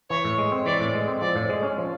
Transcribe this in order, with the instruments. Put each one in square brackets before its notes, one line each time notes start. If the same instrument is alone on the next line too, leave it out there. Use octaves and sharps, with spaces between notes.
[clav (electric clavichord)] E3 [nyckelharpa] C#5
[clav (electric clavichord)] A2
G#3
C4
[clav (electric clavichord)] E3 [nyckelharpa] D5
[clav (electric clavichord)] A2
G#3
C4
[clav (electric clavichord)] F3 [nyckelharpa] D5
[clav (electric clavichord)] A2
G#3
C#4
F3